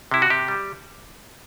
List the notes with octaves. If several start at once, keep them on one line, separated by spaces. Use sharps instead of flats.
C3 E4
F#4
C3 G4
G3